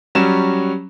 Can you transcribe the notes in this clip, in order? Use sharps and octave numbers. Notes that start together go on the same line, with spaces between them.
F#3 G3 C#4 E7